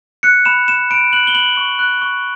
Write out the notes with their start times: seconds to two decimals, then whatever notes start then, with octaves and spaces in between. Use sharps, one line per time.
0.23 F#6 C#7
0.45 B5 E7
0.68 B5 E7
0.91 B5 D7
1.13 F#6 F#7
1.27 G7
1.34 B5 F#7
1.57 C#6
1.79 F#6
2.02 C#6